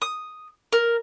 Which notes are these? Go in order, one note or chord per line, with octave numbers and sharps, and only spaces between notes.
D#6
A#4